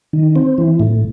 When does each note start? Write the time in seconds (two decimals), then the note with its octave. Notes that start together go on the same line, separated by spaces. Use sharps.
0.13 D#3
0.36 C4
0.58 E3
0.80 A2